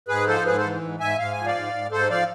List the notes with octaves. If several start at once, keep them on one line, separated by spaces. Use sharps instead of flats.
G#2 G#4 B4
F3 A4 C5
G#2 G#4 B4
A4 C5
E3
G#2
G#2 E5 G#5
G#2 F5
F3 G#5
D5 F5
G#2
G#2
G#2 A4 C5
F3 D5 F5